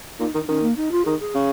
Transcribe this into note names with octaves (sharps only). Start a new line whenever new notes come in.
A#2 D#4
D#3 D#4
D#3 C#4
A#3
D#4
F4
D#3 G#4
G#4
C#3